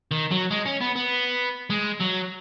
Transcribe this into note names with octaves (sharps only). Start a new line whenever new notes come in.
D#3
F#3
G#3
C#4
B3
B3
G#3
F#3